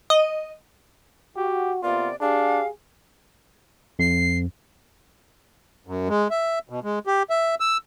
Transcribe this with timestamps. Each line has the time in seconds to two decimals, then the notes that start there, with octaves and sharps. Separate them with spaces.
0.10 D#5
1.36 F#4 G4
1.83 C3 A#3 B3 F4 D5
2.21 D4 G4 G#4 F5
3.99 F2 C7
5.87 F#2
6.09 G#3
6.31 E5
6.70 B2
6.84 G#3
7.07 G4
7.30 E5
7.60 E6